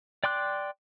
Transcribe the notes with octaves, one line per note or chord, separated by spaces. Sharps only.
D5 G5 C6 D6 F#6